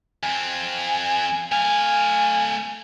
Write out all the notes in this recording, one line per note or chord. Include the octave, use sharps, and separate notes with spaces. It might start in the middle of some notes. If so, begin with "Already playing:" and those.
F2 C4 G#5
A3 F5 G#5